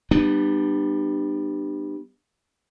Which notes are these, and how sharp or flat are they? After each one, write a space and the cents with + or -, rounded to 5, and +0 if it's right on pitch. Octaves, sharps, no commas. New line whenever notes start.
G3 +0 B3 +0 D4 +40